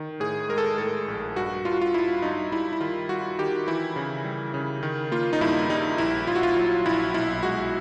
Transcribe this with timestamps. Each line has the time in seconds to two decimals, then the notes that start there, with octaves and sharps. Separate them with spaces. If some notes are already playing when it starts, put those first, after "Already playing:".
Already playing: D#3
0.20 A2 G#4
0.49 G#3 A#4
0.58 A4
0.66 A#4
0.78 A2 A4
1.08 A#1
1.36 G2 F#4
1.65 G2 F4
1.73 F#4
1.81 F4
1.94 G2 E4
2.22 G2 D#4
2.52 G3 E4
2.73 E4
2.81 D#3 F4
3.09 G3 F#4
3.39 D#3 G4
3.67 E3 E4
3.96 C#3
4.25 G3
4.54 C#3
4.83 D#3
5.12 A#3 F4
5.33 D#4
5.41 G2 E4
5.69 G3 D#4
5.98 A#1 E4
6.27 A#1 F4
6.35 F#4
6.43 F4
6.57 F#3
6.86 A#1 E4
7.14 B1 E4
7.43 G#3 F#4